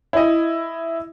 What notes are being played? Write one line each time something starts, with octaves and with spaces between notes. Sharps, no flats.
E4 D#5